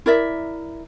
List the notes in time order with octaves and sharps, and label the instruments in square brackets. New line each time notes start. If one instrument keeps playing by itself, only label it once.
[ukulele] E4 A#4 D5 E5